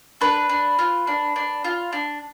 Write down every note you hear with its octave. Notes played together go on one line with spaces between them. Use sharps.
D4 B4
D4
F4
D4
D4
F4
D4